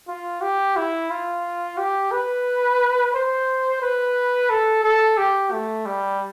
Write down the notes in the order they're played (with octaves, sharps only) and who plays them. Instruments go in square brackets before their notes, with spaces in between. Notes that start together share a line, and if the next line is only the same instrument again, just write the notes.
[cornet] F4
G4
E4
F4
G4
B4
C5
B4
A4
A4
G4
A3
G3